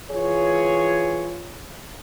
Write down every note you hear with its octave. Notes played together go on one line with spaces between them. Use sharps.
E3 F4 G#4 C#5